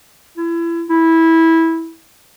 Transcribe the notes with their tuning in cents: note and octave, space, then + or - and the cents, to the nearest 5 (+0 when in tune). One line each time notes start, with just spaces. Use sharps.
E4 +30
E4 -15